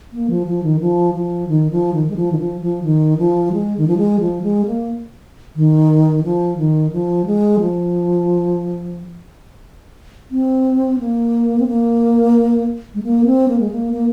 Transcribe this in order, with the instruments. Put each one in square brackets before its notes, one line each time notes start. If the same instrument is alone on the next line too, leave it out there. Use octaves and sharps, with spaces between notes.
[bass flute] A#3
F3
F3
D#3
F3
F3
D#3
F3
D#3
G#3
F3
D#3
F3
F3
D#3
F3
G#3
D#3
F3
G#3
F3
G#3
A#3
D#3
F3
D#3
F3
G#3
F3
C4
A#3
C4
A#3
G#3
A#3
C4
A#3
G#3
A#3
A#3